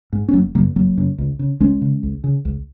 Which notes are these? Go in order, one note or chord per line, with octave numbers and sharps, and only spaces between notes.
G#2
C#4
F#1 F#3 A#3
F#2 C#3 F#3 A#3
F#1 F#3 A#3
F#2 C#3
C#2
C#3
C#2 G#3 C#4
C#3
C#2
C#3
C#2